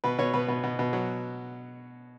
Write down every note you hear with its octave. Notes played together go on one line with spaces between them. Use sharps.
B2 B4
B2 C#5
B2 B4
B2
B2
B2
F#3